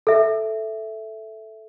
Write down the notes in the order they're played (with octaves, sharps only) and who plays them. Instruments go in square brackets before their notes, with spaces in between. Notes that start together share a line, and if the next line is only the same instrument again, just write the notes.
[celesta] A4 E5